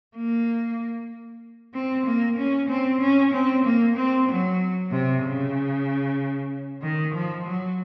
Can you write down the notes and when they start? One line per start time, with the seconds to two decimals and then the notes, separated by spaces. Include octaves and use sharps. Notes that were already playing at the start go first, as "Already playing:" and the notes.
0.16 A#3
1.74 C4
2.06 A#3
2.38 C#4
2.69 C4
3.01 C#4
3.33 C4
3.64 A#3
3.96 C4
4.29 F#3
4.91 C3
5.24 C#3
6.82 D#3
7.14 F3
7.46 F#3